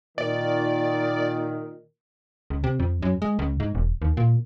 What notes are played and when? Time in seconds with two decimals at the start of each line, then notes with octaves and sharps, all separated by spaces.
0.18 A#2 D#3 D5
2.50 C#2
2.64 C3
2.80 F2
3.02 F#2
3.22 G#3
3.39 C#2
3.60 G#2
3.75 E1
4.02 D#2
4.17 A#2